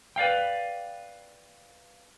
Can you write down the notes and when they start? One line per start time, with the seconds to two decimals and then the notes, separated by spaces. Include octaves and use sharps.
0.16 B4 D5 F5 G5